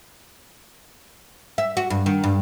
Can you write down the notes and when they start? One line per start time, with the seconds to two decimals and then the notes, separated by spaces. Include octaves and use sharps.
1.58 E5
1.77 F#4
1.90 G2
2.06 D#3
2.24 G2